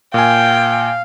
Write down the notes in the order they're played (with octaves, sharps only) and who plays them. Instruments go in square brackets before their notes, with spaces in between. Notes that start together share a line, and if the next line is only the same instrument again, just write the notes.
[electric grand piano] A#2 G#5 [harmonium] F5 [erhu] G5